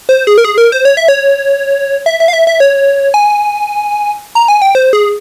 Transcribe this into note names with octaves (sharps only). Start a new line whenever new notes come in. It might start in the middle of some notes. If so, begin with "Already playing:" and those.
C5
G#4
A#4
G#4
A#4
C5
C#5
E5
C#5
E5
E5
F5
E5
E5
C#5
G#5
A#5
G#5
G5
C5
G#4